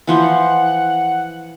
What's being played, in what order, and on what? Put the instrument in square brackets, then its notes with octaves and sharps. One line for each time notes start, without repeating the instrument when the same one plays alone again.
[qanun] E3 F3 C5 [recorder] F#5